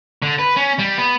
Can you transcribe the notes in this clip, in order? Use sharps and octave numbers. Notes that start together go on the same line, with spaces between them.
D3
B4
C#4
G3
B3